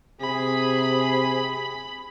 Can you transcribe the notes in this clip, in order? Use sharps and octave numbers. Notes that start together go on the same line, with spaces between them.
C3 G#4 B5